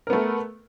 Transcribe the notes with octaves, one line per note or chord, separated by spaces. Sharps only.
A3 B3 A#4